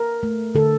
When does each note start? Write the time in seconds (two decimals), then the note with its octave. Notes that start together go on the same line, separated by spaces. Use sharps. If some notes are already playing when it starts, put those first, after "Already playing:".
Already playing: A#4
0.23 A3
0.55 D3 A4